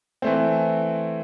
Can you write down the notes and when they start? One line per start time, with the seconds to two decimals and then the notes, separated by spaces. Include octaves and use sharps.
0.22 E3 A3 C4